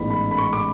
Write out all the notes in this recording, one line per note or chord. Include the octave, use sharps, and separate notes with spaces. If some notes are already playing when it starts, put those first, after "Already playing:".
Already playing: A1 G#2 E3 G#3 B3 B5
B5
B5
C#6
D6